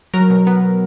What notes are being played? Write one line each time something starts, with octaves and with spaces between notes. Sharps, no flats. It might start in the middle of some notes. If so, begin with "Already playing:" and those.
F#3 A#4
B2
B3